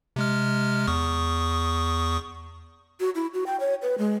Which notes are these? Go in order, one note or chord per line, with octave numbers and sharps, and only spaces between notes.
C3 G#3 F6
E2 C#6 D#6
F#4
E4
F#4
G5
C#5
B4
G#3